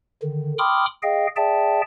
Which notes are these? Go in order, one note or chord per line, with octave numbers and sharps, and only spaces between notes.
D3 D#3
G5 B5 C6 D6 D#6 F6
G#4 D#5 F5 G5
G#4 D5 E5 G5 A5